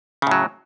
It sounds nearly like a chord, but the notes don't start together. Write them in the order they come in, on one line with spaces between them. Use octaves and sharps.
C#3 A2 F#3